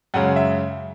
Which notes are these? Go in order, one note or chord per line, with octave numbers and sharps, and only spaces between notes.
F#2 C#3 G#3 F#5
E5